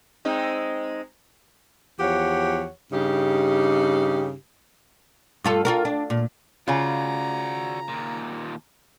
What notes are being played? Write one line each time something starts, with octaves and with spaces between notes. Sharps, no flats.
G#3 C4 D#4
E2 F3 G4 C#5 F#5
G2 C#3 D#4 G4
G2 F4 A4
F4 F#4 A#4
D4
A#2
C#3 F4 F#4 D5 A#5
D#2 A#2